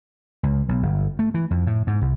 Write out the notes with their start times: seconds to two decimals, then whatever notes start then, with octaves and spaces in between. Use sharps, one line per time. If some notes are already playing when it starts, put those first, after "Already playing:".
0.43 C#2
0.69 B1
0.83 G1
1.19 A3
1.34 E3
1.51 F2
1.67 A2
1.87 G#2
2.01 C2